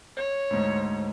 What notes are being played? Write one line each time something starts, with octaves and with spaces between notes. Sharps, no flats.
C#5
D2 G#2